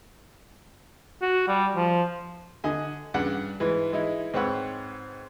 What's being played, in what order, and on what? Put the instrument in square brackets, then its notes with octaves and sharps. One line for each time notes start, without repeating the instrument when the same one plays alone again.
[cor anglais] F#4
G3
F3
[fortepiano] D3 D#5 G#5
G2 C#3 D4 F#5
G#2 E3
E3 G#3 D#4 E4
G#2 C4 B4 C#5 F#5 E6